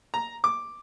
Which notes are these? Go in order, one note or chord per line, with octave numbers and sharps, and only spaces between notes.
A#5
D6